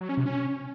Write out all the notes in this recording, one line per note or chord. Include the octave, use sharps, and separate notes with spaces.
F#3
C#4
C3
C#4